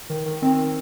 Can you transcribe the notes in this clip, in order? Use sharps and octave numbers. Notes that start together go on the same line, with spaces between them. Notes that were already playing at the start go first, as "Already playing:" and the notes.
D#3
D#3
D#3 C4